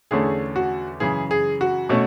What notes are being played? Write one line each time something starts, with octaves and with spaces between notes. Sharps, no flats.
E2 D3 A3 C#4 G#4
F#4
F#2 C#3 E3 G#4
G#4
F#4
B2 A3 C#4